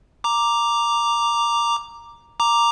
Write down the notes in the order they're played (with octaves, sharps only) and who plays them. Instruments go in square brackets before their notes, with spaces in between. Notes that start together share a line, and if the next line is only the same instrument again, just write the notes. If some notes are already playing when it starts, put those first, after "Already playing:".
[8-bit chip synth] A#5 D6
A#5 D6